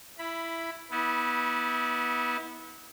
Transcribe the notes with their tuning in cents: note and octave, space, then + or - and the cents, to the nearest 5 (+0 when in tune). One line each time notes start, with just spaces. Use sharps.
E4 +10 B5 +0
B3 -15 E4 -35